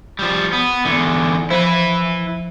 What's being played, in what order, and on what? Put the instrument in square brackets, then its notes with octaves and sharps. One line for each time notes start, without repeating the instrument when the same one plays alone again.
[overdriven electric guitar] F3 G3
B3
E2 D3
[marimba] F3 C5 [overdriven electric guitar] E4 B4